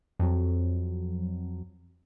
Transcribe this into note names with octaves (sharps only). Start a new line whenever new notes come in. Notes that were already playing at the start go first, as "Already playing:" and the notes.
F2 F#3